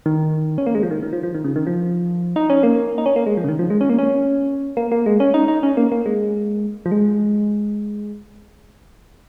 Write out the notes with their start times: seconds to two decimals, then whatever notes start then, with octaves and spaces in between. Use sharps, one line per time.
0.06 D#3
0.58 C#4
0.66 A#3
0.75 G#3
0.83 F3
0.91 D#3
1.03 D#3
1.13 F3
1.23 F3
1.35 D#3
1.44 C#3
1.56 D#3
1.67 F3
2.36 D#4
2.50 C#4
2.63 A#3
2.98 D#4
3.06 C#4
3.16 A#3
3.26 G#3
3.37 F3
3.44 C#3
3.49 D#3
3.59 F3
3.70 G#3
3.81 C#4
3.90 A#3
3.99 C#4
4.77 A#3
4.92 A#3
5.06 G#3
5.20 C#4
5.34 D#4
5.48 D#4
5.63 C#4
5.77 A#3
5.92 A#3
6.06 G#3
6.86 F3
6.92 G#3